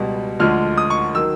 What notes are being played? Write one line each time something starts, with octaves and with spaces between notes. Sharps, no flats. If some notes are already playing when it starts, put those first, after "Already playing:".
Already playing: C#2 B2 G3
D2 D3 F3 G#3 F6
D#6
C#6
D#3 F#3 E6